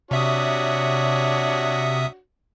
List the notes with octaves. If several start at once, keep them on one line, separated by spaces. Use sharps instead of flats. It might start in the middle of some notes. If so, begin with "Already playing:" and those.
C3 D4 F#4 C#5 E5 D#6